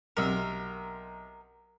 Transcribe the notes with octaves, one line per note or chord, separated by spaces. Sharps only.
B1 C3 A#4